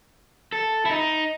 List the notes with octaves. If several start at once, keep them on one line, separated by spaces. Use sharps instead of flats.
A4
E4
D#4